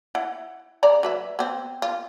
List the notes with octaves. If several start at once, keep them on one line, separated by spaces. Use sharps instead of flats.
E4 F#5
C#3 D5 A#5
F#3 B4 E5
B3 C4
F4